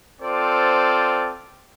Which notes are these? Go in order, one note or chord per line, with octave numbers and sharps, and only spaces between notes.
C4 F4 A4 C5 D5